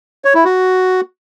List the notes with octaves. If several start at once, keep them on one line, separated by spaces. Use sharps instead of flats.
C#5
E4
F#4